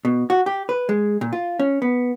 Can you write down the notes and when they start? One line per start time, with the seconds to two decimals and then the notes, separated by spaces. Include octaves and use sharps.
0.05 B2
0.30 F#4
0.46 G4
0.69 B4
0.89 G#3
1.21 A#2
1.33 F4
1.59 C#4
1.82 B3